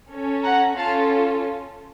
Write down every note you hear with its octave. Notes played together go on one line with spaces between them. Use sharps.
C#4 A4
F#5 A#5
C#4 F4 A4 F5 A5